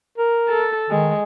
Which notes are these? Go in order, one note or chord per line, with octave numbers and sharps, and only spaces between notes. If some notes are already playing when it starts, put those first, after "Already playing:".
A#4
A4
D#3 G#3